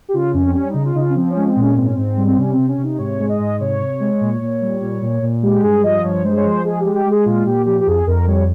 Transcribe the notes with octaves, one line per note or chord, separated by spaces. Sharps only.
G4
C#3 F4
F2 C#4
C4
G3 C#4
C#3 D#4
F4
C#3 D#4
F4
C#4
F3 C4
C#4
G#3
C4
A#2 C#4
G#2 C4
C#4
G#2 C4
G3
C4
C3 C#4
C4
C3
C#4
C3
D#4
G#2 C#5
G#3
D#5
G#2
C3 C#5
C3
G#3
A#2
A#2
G3
A#2
A#2
A#2
G#3 G4
G2 G#4
F3 D#5
G2 C#5
G#3 C5
C#5
F3 C5
G#3 G#4
G#3 G4
G4
G#3
G#4
A#2 F4
A#2 G4
F3 G4
G4
F2 G#4
F2 A#4
G3 C#5